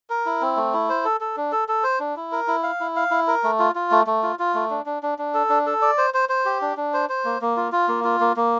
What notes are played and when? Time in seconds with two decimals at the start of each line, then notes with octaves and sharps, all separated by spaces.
0.10 A#4
0.26 E4
0.41 C4
0.56 A3
0.73 E4
0.89 C5
1.05 A4
1.21 A4
1.37 D4
1.52 A4
1.68 A4
1.84 C5
2.00 D4
2.16 E4
2.32 A#4
2.48 E4
2.63 F5
2.80 E4
2.96 F5
3.11 E4
3.27 A#4
3.44 A3
3.59 F4
3.75 F4
3.91 A3
4.07 A3
4.23 F4
4.39 F4
4.54 A3
4.70 D4
4.86 D4
5.03 D4
5.18 D4
5.34 A4
5.49 D4
5.66 A4
5.82 D5
5.98 C5
6.14 C5
6.29 C5
6.45 G4
6.62 D4
6.77 D4
6.94 C5
7.09 C5
7.25 A#3
7.41 A#3
7.57 F4
7.72 F4
7.88 A#3
8.04 F4
8.20 A#3
8.36 A#3